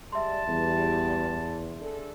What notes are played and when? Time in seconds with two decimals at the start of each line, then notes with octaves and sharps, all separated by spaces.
0.12 G3 G#3 D5 E5 A5 C6
0.48 E2 G3
1.79 D4 G#4 A4